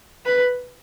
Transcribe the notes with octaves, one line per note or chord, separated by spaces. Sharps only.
B4